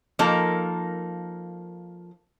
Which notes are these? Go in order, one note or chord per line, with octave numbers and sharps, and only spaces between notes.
F3 A#3 D#4 A4 A#4